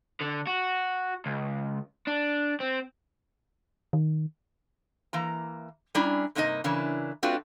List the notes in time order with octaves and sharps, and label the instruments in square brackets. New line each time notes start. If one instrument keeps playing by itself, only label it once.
[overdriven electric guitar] D3
F#4
C#2
D4
C4
[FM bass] D#3
[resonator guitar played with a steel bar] E3 A#3 A#5
G3 C#4 D4 E4 A#5
G2 C3 A#3 D#4 F#4 D#5
C#3 E3 D4 E4 A#4
A3 C4 D4 F4 F#4 B4